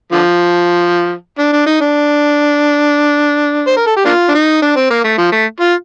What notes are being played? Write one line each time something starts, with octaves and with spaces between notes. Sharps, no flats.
D3 F3
D4
D4
D#4
D4
C5
A#4
A4
G4
A#3 D4 F4
D4
D#4
D4
C4
A#3
A3
F3
A3
F4